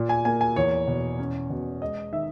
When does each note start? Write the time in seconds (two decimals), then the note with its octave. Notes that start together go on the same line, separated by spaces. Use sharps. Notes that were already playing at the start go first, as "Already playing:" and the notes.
Already playing: A#2
0.09 G#5
0.25 A#3 G#5
0.41 G#5
0.56 E2 C#5
0.87 B2
1.19 C#4
1.50 B2
1.81 G#3 D#5
2.12 D#3 E5